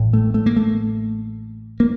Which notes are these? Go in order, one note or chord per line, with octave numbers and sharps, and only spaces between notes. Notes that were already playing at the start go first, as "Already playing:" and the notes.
Already playing: A1 A2
A3
A3
A#3
A3
A#3